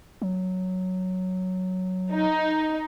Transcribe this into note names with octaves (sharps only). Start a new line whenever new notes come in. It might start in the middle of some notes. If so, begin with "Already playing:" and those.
F#3
D#4